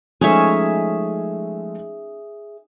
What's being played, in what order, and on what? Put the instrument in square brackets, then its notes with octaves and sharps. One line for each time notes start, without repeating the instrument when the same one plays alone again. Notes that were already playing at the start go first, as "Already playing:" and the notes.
[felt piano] F3 G#3 A3 [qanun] C#4 D#4 C#5 [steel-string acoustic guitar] G#4 E5